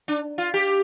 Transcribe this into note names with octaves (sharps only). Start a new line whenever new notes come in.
D4
F4
G4